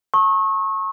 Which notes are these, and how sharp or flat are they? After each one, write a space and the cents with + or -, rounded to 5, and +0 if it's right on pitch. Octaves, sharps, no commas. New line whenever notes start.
A5 +35 C#6 -30 E6 -45